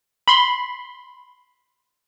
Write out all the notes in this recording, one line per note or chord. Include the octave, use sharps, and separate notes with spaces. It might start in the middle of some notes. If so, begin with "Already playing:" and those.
B5 C6